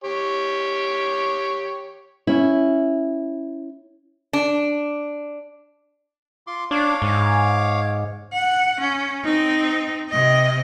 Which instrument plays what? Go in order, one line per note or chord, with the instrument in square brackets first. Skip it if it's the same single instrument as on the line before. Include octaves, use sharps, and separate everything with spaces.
[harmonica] G4 C#5
[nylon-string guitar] C#4 E4
[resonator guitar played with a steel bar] D4
[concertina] F4 C6 D6
[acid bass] D4 [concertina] C#5 F5 D6
[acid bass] G#2
[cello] F#5
C#4
C4 D#4
C3 D#5